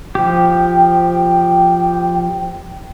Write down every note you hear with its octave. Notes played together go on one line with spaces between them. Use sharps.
F3 G4 G5